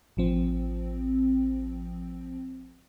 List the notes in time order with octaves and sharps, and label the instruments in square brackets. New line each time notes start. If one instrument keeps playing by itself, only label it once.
[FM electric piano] A1 F3 C4